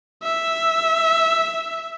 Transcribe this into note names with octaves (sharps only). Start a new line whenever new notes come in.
E5